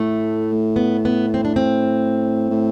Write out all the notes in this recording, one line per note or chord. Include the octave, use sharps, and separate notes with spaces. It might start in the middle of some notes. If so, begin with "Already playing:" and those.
Already playing: A2 A3
B3
B3
C4
D4
C4
A2